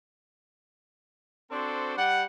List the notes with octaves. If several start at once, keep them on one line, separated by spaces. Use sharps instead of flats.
C4 D4 F#4 A4 C5
G3 G4 F#5